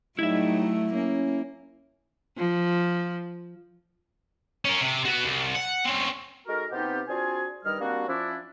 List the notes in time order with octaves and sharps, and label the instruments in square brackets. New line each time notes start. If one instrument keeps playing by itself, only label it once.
[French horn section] A2 G3 D#4 [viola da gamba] F#3 A3 [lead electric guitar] E4 E5
[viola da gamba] A#3 [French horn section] C#4
[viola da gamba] F3
[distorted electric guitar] C#4 A#4
C3
B3 F#4
C2
F#5
C4 C#4
[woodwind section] G#3 D#4 F#4 A4 A#4
C3 B3 C4 D#4 F4 G4
C4 D4 F4 F#4 G#4 G#5
G2 D#3 G3 A#4 D#5 F6
G3 A#3 C4 D4 F#4
F3 C#4 D4 E4